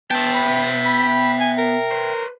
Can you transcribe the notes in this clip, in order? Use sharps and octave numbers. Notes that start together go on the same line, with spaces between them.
B3 E5 G5 A5
B5
B5
G#5
A#4
B4 C5